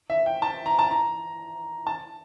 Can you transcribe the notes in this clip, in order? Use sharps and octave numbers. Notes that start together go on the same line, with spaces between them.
E5
G5
A5
A#5
A5
A#5
A5